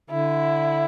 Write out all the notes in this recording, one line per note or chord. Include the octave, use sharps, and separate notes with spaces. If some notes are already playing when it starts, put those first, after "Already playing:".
D3 E4